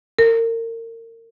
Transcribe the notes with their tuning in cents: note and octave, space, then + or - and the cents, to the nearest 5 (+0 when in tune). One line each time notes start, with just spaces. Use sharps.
A#4 -35